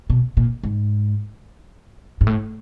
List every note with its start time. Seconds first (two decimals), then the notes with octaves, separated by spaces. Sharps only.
0.10 B2
0.37 A#2
0.63 G#2
2.21 G#2
2.27 A2